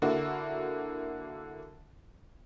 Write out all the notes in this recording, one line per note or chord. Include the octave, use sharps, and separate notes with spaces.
D3 A#3 E4 F#4